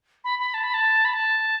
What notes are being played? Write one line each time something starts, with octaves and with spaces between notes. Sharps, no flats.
B5
B5
A5
B5
A5
B5
A5